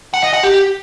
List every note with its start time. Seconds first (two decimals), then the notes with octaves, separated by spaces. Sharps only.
0.14 F#5
0.24 D#5
0.33 F#5
0.43 G4